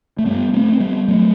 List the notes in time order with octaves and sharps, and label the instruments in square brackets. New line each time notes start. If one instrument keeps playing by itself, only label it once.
[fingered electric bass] A3
G2 G3 B3
A3 C4
C4
G3 B3
G2 F#3 A3